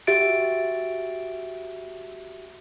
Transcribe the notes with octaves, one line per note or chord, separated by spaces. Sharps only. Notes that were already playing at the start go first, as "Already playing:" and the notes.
F#4 G4 E5 A6 D7